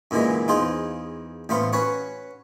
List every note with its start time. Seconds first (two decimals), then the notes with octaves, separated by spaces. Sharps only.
0.11 F#2 A#2 D3 E3 G#3
0.48 E2 D#4 F4 G#4 C5
1.49 A1 A3 B3 C5 F5
1.73 C#4 F#4 B4 C#5